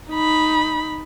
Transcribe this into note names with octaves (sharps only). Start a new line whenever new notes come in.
D#4 B5